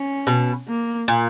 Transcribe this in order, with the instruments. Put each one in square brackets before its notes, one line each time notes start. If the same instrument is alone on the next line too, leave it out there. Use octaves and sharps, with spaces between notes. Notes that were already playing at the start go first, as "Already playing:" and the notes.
Already playing: [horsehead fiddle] C#4
[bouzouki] B2
[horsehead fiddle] A#3
[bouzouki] A#2